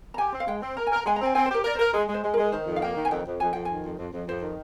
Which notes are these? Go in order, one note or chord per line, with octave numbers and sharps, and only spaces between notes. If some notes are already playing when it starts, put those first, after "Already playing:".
A#5
G4 G#5
C4
F5
G#3 G5
C4
A#4 A#5
G#5
A#4 A#5
G#3 G#5
A#5
C4 G#5
C4 G#5
C5
G4 A#4
A#4 D5
C5
A#4
G#3 G#4
G#3
C5
G#3
A#4
G#3
D#3 C5
F2
F5
A#3 G5
D#3
G#5
F2 G5
F2
F2 G#5
F2 G5
D#3 G#5
F2
F2
F2
F2 C5
D#3